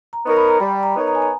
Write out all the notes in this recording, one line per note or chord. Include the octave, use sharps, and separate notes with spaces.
A#5
B3 D#4 A#4 C#5 C#6
B5
A#5
G3 B5
A#5
B3 D#4 A#4 C#5
A#5
G#5
A#5